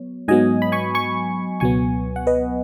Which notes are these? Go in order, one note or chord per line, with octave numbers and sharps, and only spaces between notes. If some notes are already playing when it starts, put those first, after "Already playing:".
Already playing: F#3 B3 C#5
G#2 F#3 B3 D#5 G#5
B5
G#5 C#6
G#5 C#6
C#2 B2 F#3 B3 G#5 C#6
F#5
B4 D#5